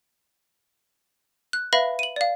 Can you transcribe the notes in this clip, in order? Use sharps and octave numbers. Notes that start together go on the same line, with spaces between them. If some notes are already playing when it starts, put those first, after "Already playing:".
F#6
B4 E5 F5 B5 A#6
D#7 F#7
D5 F5